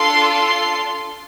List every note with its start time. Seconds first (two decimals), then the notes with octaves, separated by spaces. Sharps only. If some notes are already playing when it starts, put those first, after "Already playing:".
Already playing: D4 F4 A4 C6
0.32 C6